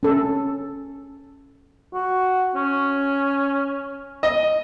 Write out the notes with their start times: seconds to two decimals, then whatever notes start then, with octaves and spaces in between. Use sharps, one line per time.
0.03 C#4 A4
1.93 F#4
2.55 C#4
4.23 D#5